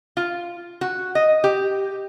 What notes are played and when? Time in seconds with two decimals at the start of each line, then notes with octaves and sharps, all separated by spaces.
0.17 F4
0.81 F#4
1.15 D#5
1.44 G4